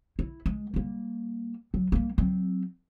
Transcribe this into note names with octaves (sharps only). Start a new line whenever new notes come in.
E4
G#3
G3 A#3
F#3
G3 A#3
F#3 C4